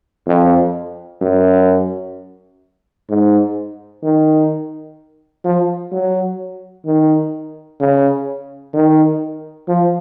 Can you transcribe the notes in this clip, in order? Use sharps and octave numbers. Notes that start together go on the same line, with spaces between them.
F2
F#2
G#2
D#3
F3
F#3
D#3
C#3
D#3
F3